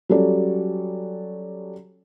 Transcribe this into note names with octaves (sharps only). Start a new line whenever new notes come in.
F#3 G3 C#4 A4 D5